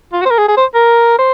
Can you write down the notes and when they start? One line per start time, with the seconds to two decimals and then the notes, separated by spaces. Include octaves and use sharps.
0.12 F4
0.21 F#4
0.25 C5
0.30 A#4
0.38 G#4
0.48 G#4
0.57 C5
0.74 A#4
1.18 C5